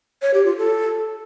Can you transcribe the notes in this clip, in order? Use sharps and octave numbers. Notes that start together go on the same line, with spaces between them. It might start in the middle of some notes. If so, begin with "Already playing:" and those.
C#5
G4
F4
A4